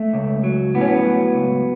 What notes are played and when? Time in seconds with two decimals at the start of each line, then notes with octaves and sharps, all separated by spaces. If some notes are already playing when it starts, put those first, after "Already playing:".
Already playing: A3
0.14 C#2
0.44 F#3
0.75 A2 B3
0.81 C#4
0.88 B3
1.05 F#3
1.35 C#2